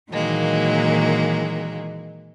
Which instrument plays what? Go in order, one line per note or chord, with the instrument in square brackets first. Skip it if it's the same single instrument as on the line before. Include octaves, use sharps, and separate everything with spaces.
[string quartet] A#2 D#3 E3 F#3 G#3 A#3